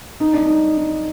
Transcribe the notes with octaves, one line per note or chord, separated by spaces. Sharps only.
D#4
D4
D#4
D#4